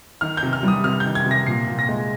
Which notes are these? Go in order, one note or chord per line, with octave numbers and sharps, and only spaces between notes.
D#3 F6
G6
C3
F6
G3
D#6
C3 F6
G6
D#3
G#6
C3
A#6
A#2 C7
A#2
A#6
G#3